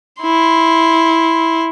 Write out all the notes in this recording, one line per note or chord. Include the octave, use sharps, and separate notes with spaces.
E4 C6